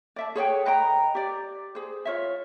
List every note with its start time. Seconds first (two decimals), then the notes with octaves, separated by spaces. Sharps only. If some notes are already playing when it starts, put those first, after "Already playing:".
0.16 D5 E5 A5
0.35 G#4 C#5 F#5 G5
0.65 B4 D#5 G5 A#5
1.15 G4 D5
1.75 G#4 C5
2.05 F4 C#5 E5